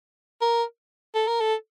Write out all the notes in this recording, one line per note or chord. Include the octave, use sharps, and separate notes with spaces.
A#4
A4
A#4
A4